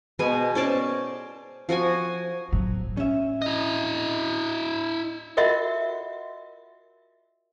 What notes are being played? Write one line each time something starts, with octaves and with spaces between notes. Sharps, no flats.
B2 G#3 B4 G#5
C#4 C5 D5 A5
F3 F#4 F#5 G#5
A2 F#3
C#4 E5
E4 D#5
F4 F#4 A#4 D#5 E5 F#5